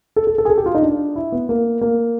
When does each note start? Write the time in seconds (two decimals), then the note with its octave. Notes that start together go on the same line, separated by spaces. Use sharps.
0.16 A4
0.27 A4
0.38 A4
0.45 G#4
0.50 A4
0.58 G4
0.66 F4
0.75 D#4
0.82 D4
1.16 E4
1.32 B3
1.49 A#3
1.81 A#3